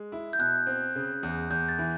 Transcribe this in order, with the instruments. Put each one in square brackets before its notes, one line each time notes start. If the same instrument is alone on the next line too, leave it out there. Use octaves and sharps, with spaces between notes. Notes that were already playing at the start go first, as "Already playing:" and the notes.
Already playing: [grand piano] G#3
E4
[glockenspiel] G6
[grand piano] B2 [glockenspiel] F#6
[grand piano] C4
C#3
E2
[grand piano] E2 [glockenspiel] G6
[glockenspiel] A6
[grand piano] E3